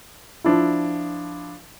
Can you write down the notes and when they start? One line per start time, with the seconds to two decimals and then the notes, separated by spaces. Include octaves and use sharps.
0.44 F3 D4 E4